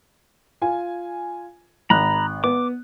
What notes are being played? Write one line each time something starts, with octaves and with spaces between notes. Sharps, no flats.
F4 G#5
G#1 A#5 B5 F#6
B3 D6